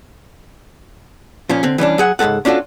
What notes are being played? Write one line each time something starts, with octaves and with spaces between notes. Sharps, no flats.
A#2 F3 C#4
D3 C4
E3 G3 C#4 D4
F#3 G#4 F#5
C#2 G#2 G#3 A4 F#5
C#4 D4 F4 F#4 A4